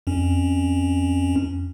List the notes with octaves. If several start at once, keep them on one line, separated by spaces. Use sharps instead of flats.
F2 C#4